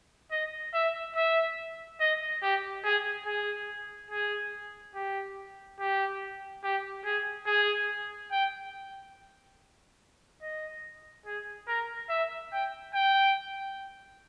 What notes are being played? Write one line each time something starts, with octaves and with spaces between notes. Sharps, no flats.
D#5
E5
E5
D#5
G4
G#4
G#4
G#4
G4
G4
G4
G#4
G#4
G5
D#5
G#4
A#4
E5
G5
G5